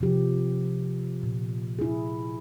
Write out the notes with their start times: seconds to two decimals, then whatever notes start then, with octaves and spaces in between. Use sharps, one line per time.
0.01 C3 F3 G4
1.23 A#2
1.79 E4 G#4